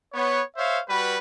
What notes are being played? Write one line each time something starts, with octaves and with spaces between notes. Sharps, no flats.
B3 C#5
C5 C#5 E5 F5
G3 F#4 B4